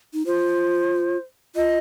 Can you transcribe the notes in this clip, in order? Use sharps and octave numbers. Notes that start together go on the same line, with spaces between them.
D#4
F4 C5
F4 D#5